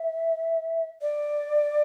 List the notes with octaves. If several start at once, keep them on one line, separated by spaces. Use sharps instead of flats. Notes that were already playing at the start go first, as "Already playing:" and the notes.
Already playing: E5
D5